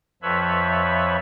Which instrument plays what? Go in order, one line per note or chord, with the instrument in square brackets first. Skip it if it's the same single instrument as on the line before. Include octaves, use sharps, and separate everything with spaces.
[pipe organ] F2 F3 B4 C#5 E5 B5